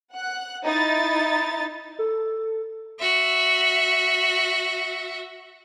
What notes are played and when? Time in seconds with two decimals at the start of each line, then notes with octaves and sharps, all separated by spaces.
0.14 F#5 F#6
0.64 D#4 E4 A6
1.99 A4
2.99 F#4 E5